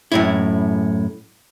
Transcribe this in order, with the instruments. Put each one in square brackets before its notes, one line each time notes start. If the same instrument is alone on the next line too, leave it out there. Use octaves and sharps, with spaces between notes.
[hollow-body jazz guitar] F#2 A2 E4